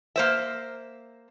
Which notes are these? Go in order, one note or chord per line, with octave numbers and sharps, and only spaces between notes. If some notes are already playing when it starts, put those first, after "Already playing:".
A#3 C5 E5